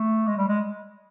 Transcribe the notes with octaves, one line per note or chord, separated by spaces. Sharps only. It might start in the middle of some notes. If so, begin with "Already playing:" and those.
Already playing: A3
G#3
G3
G#3